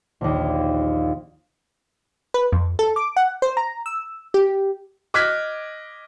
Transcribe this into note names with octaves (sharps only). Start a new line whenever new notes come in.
A#1 D#2
B4
F2
A4
D6
F#5
C5
A#5
E6
G4
D#5 D6 F6 F#6 G#6 B6